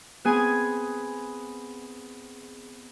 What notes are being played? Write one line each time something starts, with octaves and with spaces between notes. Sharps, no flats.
B3 C4 G#4 G#5